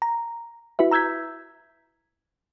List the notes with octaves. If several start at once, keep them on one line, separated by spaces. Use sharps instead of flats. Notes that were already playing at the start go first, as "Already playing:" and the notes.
A#5
E4 F#4 B4 E5
A#5 E6 G6 G#6 B6